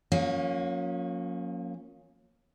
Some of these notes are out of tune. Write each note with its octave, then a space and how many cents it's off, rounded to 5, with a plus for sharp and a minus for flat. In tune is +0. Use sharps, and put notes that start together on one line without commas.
F3 +45 A#3 +0 C#4 +0